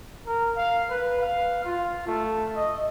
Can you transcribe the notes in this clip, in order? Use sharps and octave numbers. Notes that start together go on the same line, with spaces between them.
A#4
F5
B4
F5
F4
A3
D#5